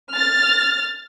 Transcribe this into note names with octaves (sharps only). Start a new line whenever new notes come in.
F6 A6